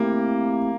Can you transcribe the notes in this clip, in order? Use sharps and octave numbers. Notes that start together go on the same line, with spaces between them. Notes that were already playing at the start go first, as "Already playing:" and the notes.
Already playing: A3 A#3 C4 E4 G4